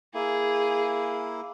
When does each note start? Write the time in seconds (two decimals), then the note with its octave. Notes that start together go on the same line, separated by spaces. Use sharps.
0.14 A#3 E4 G#4